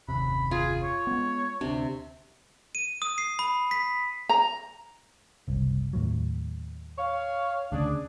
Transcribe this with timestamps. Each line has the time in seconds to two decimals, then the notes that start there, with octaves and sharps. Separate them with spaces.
0.08 F#1 D#2 C3 B5
0.51 F4 G#4
0.83 C#5
1.07 G#3 B3
1.61 D2 C3 C4 D4
2.75 D#7
3.02 D#6
3.18 C7
3.39 B5
3.71 B6
4.29 A#5
5.48 F#1 C2
5.93 D#2 A2 F#3
6.99 C#5 F5
7.72 D2 C#3 D4 G#4